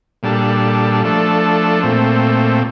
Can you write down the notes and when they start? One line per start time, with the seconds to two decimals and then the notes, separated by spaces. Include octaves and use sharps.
0.23 A#2 G3 D4 A4
1.04 F3 A3 D4 A4
1.83 A#2 A3 C4